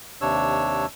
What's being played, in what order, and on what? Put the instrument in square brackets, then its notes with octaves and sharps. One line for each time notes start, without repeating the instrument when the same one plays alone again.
[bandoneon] D#2 C3 D4 C#5 E6